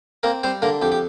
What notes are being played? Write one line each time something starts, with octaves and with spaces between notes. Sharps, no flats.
A#3 C4 A#4
G3 C4 C5
D3 A#3 A#4
F2 G4
G4